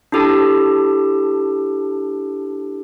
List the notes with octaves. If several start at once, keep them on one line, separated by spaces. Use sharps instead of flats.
D4 E4 G4 A4 A5